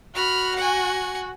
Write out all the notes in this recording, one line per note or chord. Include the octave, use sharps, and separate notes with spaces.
F#4 B5 F6
F#5 G#5